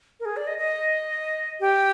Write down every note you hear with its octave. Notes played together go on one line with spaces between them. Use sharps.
A#4
G#4
D5
D#5
D#5
G4